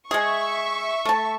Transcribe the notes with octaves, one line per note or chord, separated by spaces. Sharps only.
G#3 G#4 E5 C#6
A3 A5